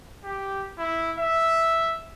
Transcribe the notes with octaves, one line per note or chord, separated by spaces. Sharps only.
G4
E4
E5